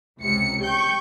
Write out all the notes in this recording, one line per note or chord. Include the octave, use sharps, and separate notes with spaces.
C#2 C3 C#7
G5 C#6 G6